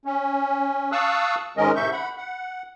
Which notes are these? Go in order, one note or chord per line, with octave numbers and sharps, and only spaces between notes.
C#4
F5 A5 C#6 D#6 E6 F#6
G#2 D#3 G#3 C#4 A#4 D#5
A2 C3 E5 C#6 G6
F#5 B5
F#5